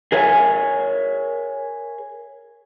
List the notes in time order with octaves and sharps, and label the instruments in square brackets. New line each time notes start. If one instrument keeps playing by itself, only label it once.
[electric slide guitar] G#4 A#4 C#5 E5 G5 G#5